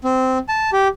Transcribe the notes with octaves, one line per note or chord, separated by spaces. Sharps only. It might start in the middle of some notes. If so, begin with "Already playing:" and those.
C4
A5
G4